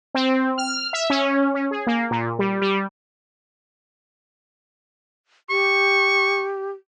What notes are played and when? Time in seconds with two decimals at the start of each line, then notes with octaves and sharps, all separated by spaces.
0.14 C4
0.58 F6
0.93 E5
1.10 C#4
1.54 C#4
1.71 G#4
1.87 A#3
2.11 A#2
2.39 G3
2.62 G3
5.50 G4 C#6